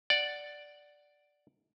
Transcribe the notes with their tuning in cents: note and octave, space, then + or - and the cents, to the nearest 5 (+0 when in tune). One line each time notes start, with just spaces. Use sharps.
D5 +0 F#5 +5